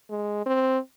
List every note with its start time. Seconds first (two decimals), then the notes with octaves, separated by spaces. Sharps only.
0.10 G#3
0.46 C4